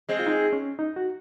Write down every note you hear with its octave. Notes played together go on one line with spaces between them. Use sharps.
G#3 C4
F4
D#4
C#4
D#4
F#4